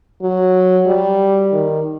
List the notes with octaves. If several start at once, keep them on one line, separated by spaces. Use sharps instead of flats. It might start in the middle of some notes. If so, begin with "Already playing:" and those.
F#3
G3
D#3